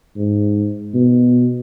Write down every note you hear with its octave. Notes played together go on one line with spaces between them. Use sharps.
G#2
B2